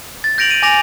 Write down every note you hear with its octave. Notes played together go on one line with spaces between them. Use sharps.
A6
G6 A#6 D7 F7 F#7
D#7
G#5 D6 A#6 F7